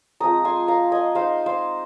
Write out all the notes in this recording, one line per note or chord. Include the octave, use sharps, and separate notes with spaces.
F3 G#3 C4 A#5 D#6
G#5 C6
F5 A#5
D#5 G#5
G#3 D#4 C5 F5
C5 F5